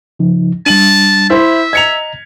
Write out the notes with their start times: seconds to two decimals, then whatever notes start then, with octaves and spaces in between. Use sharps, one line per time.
0.19 C#3 F3 D#4
0.66 G3 D4 A5 D#7 F#7
1.30 E4 C5 E5
1.73 D#5 A#5 G#6 C#7 F7